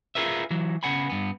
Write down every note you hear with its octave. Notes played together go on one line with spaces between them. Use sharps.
F4 G#4 A#4 B4 E5
E3 F#3
C#3 B3 F#5 G#5 B5
G2 B3